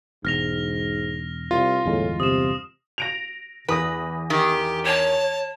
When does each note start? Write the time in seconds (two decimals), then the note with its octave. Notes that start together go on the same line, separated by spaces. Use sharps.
0.25 E1 G#2 F6 A#6 F7
1.51 C2 F4
1.85 G1 E2 A2 G#3
2.20 C3 D#6 E7
2.98 A#6 D7 F7
3.69 E2 B4 D#6 A#6
4.30 D#3 G4
4.86 C#5 A5